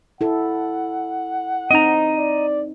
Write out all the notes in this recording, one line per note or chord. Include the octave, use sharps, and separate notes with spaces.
E4 A4 F#5
C4 D#4 D#5 A#5
D5